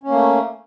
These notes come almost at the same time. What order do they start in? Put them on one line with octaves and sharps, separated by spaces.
C#4 A#3 A3